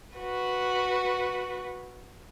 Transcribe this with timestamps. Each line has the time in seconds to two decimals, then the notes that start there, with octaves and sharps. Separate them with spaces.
0.17 F#4 B4